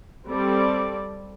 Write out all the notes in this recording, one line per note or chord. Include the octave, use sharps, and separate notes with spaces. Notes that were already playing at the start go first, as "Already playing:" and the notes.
G3 C4 A4 D5